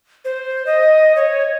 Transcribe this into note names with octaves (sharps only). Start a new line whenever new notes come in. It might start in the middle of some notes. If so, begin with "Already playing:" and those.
C5
D#5
C#5